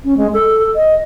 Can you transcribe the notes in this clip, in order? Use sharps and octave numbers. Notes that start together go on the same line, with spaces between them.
C#4
G#3
A4
D#5